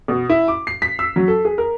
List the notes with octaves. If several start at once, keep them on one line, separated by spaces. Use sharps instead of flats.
B2
E4
D6
C7
B6
E6
F#3
A4
G#4
A#4